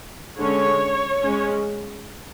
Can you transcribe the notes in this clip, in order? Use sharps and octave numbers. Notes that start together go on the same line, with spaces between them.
D3 G#3 C#4 C#5
G#3 C#4